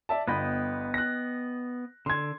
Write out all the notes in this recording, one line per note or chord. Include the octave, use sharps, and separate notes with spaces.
D5 E5 A5
G1 B3 D#5 G5 B5
F#6 A#6
D3 C6 G#6